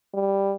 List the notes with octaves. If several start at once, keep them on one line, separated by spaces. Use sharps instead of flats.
G3